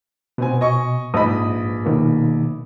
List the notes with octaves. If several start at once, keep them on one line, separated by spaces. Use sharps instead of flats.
B2 B3 C4 G#5
D#5 G#5 C#6
A#1 G#2 B4 D#5 B5 D#6
B2 D#3 A#3